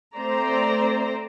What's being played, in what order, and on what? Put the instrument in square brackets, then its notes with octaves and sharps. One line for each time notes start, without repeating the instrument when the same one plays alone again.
[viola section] A3 C4 C5 D5 A#5